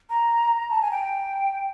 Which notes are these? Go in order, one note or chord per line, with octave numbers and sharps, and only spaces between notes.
A#5
A5
G#5
G5